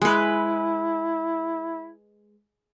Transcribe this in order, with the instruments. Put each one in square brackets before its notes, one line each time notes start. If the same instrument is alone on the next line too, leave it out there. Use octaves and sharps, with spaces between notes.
[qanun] G#3 B4 [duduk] E4